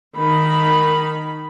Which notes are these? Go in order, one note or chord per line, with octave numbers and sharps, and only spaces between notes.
D#3 B5